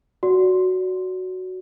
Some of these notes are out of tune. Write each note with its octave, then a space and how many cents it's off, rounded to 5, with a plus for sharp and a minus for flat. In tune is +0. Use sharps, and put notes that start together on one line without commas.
F#4 +0 D5 -20